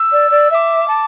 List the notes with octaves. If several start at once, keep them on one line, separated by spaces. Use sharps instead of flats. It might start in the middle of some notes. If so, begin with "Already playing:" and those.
Already playing: E6
D5
D5
E5 D6 E6
A5